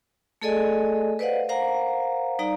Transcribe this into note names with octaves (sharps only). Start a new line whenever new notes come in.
A3 G#4 A4 D5 D#5 G#5
B4 C5 D5 D#5 F5 F#5
A#4 C5 F5 F#5 A#5
G3 D#4 D5 F5 A#5